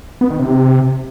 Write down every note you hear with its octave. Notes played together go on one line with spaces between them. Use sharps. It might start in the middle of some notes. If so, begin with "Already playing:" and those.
B3
D#3
C3